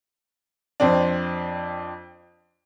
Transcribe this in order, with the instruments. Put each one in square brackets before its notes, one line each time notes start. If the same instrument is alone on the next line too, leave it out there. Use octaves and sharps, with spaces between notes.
[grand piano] F2 C4 D4